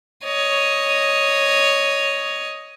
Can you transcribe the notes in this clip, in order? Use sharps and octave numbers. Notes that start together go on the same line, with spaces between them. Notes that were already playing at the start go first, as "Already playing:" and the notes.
C#5 D#5